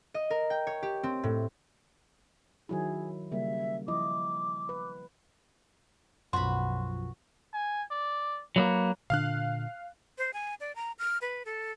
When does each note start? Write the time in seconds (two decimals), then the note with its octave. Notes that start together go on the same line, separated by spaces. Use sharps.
0.14 D#5
0.30 A#4
0.50 G5
0.67 C#5
0.83 G4
1.03 C4
1.23 A2
2.69 D#3 F#3 E4 G#4
3.32 C#3 G3 A#3 E5
3.88 F3 E4 D#5 D6
4.69 B4
6.33 B1 F#2 F3 F#4 B5 C6
7.53 G#5
7.91 D5
8.56 F#3 A3 A#3 B4
9.10 A#2 D3 D4 F5 F6 F#6
10.18 C5
10.33 G#5
10.61 D5
10.76 A#5
10.99 F6
11.22 B4
11.45 A4